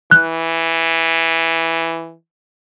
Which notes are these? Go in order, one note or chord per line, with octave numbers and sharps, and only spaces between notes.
E3 F#6